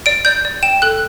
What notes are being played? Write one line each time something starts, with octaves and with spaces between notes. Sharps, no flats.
D5 D7
D5 G6
D5
G5 E7
A4 F#6